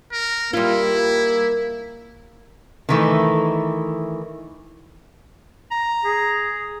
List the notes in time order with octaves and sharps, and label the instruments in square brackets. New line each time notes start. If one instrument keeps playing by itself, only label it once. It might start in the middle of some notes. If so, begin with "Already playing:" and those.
[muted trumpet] A#4
[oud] G3 F4 [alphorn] A#3 [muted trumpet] E4
[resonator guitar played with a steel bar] D#3 E3 A3
[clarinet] A#5
[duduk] G#4